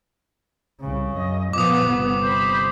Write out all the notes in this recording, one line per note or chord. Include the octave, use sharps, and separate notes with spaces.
C2 C#3
F#2 D#5
A#2 F3 B3 D6 D#6
G1 C3
C5 B5